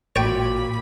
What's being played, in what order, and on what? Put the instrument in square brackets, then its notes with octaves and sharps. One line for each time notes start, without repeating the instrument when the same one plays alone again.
[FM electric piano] A1 [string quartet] A#2 B5 [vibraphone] F#4 D6 [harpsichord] C#5 G5